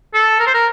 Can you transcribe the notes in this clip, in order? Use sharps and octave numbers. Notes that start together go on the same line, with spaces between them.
A4
A#4
C5
A#4